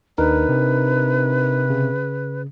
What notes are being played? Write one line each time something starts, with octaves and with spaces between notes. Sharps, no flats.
D#2 D4 D#4 A#4 B4
C3
C#3